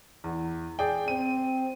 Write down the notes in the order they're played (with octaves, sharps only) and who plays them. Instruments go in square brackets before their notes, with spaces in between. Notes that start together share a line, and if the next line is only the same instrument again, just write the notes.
[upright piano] E2
G#4 D5 G5
[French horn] C4 [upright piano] D#7